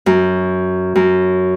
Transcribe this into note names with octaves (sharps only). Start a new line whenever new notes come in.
F#2
F#2